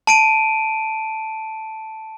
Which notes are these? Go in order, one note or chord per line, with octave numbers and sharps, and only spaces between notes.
A5 D7 D#7